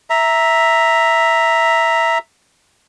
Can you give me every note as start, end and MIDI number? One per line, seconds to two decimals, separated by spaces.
0.10 2.18 76
0.10 2.18 82